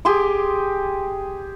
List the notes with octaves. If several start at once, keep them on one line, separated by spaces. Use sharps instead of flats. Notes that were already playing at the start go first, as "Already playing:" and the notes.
G4 G#4 C6 D6